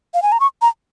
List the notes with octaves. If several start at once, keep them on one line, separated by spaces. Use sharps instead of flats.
F5
G#5
A#5
C#6
A#5